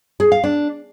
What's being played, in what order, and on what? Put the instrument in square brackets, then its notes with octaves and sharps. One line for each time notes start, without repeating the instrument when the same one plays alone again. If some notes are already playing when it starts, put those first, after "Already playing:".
[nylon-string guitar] G#4
F5
D4